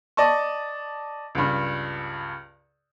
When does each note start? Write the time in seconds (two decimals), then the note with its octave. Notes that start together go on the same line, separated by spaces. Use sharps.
0.17 D5 D#5 A5 C#6
1.35 C#2 G2